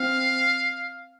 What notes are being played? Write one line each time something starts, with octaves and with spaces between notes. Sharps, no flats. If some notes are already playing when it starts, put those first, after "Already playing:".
Already playing: C4 F5